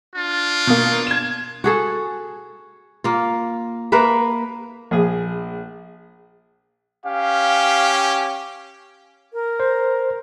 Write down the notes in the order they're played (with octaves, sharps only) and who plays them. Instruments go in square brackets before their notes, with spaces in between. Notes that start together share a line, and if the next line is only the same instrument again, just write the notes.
[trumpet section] D4 F4
[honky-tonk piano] B2 A#3
G#6 E7
[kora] F#4 G#4 A4
A#3 F4
A#3 A#4 B4 E5
[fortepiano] A#1 G#4
[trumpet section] C#4 G4 [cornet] F5
[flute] A#4
[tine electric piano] C5